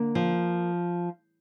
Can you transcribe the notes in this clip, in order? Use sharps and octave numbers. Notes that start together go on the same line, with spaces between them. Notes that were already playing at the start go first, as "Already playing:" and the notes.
Already playing: D3 A#3
F3